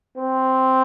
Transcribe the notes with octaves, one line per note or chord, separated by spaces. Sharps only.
C4